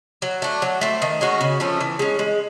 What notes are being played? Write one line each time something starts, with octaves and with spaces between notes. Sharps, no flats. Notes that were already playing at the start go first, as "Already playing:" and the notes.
F#3
A3 D4
F#3
A3 C4
D#3
G#3 C#4 F#4
C#3
F3 A3 C#4
E3
G#3 C#4
G#3